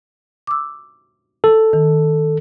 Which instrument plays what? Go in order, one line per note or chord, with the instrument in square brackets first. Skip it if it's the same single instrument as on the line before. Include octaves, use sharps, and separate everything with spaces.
[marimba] D6 E6
[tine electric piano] A4
[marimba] D#3